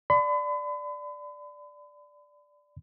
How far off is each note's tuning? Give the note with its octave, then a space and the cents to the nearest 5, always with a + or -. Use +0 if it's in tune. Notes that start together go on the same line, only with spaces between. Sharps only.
D5 +0 B5 +40